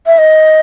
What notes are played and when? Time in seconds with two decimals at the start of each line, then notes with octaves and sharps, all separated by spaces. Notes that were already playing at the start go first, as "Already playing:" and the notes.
0.07 E5
0.18 D#5